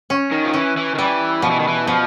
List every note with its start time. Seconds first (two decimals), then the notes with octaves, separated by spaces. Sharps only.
0.10 C#4
0.31 D#3
0.45 F3
0.54 E3 C#4
0.77 E3
0.95 D#3
0.98 E3 G3
1.42 B2 F3
1.51 E3
1.60 D#3
1.68 E3
1.87 B2 F3